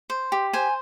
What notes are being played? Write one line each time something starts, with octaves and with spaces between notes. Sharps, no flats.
C5
G4
C5 G#5